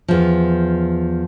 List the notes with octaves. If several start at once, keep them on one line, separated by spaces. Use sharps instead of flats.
E2 F3